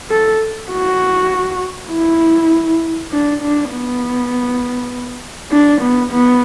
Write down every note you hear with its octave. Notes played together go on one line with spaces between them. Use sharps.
A4
F#4
E4
D4
D4
B3
D4
B3
B3